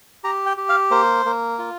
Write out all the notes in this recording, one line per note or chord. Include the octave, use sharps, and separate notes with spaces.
G4 A#5
G5
G4
F5
A#3 C5
A#3
F4